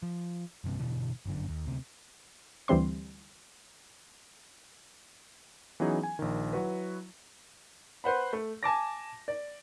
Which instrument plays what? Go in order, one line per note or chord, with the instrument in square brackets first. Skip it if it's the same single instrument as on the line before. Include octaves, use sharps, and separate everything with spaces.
[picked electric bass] F3
G1 C2 G2 C3
G1 B2 D3 E3
G1 F#2 D3
D#2
D2 C3
[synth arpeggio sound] D2 E3 G3 C4 C6
[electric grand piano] E3 F#3 B3 C#4 D#4 G#4
G#5
A#1 D#3
F#3 E4 F#4 B4
[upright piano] B4 C5 F#5 B5
A3
G#5 A5 D6 A#6
D5